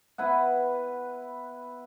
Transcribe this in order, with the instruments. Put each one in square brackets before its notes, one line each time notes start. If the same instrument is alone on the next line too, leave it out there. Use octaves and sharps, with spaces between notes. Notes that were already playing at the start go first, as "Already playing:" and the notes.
[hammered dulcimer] B3 E4 B4 F#5